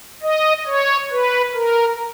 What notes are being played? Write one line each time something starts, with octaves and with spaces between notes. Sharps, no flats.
D#5
C#5
B4
A#4